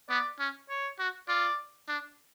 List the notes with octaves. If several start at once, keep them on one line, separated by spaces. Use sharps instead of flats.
B3 D5
C#4
C#5
F#4
F4 D5
D4